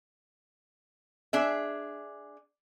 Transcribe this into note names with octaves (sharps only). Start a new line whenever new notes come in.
D4 G#4 E5